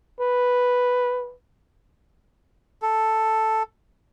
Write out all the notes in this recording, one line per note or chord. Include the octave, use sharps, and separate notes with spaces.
B4
A4